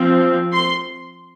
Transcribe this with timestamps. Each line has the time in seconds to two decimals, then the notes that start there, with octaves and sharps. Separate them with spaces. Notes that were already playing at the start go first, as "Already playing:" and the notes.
Already playing: F3 C4
0.52 C6